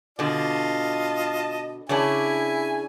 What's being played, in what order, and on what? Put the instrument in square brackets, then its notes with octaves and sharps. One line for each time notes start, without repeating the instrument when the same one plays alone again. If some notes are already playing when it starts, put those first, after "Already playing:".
[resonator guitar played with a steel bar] B2 D3 [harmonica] F4 D#5 A5
[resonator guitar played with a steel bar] C#3 C#4 D4 [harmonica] E4 G#5